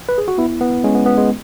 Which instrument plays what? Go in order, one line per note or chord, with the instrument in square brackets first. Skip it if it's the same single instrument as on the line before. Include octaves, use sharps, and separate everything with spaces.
[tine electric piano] B4
G#4
F#4
B3 E4
B3
G#3 C#4
B3
B3
G#3